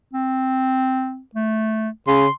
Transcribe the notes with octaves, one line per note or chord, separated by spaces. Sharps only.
C4
A3
C#3 C6